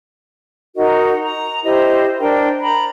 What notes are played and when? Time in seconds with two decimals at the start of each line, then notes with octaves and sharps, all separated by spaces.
0.76 D#4 F#4 A#4 D#5
1.23 A#5
1.64 E4 G4 C5 D#5
2.20 D4 A#4 C5 G5
2.60 A#5 B5